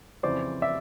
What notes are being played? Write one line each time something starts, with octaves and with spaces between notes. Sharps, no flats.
F2 C#3 E3 C5 D5
D5 E5